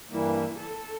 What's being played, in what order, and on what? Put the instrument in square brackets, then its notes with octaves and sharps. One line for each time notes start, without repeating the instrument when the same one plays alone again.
[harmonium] G2 E3 G3 A#3 [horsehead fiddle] E4
[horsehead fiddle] A4